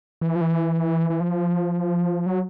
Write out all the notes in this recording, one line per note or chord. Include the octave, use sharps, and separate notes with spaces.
E3
F3
E3
E3
F3
F#3